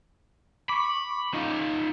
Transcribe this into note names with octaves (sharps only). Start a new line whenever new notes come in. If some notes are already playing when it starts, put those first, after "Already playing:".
B5 C#6 D6
D#4 F4